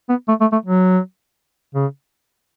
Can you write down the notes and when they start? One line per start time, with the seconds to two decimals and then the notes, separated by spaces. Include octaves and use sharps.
0.09 B3
0.29 A3
0.41 A3
0.52 A3
0.66 F#3
1.75 C#3